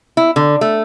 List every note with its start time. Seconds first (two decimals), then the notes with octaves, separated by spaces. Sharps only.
0.17 E4
0.36 D3
0.61 A3